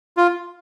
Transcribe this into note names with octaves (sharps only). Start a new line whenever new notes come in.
F4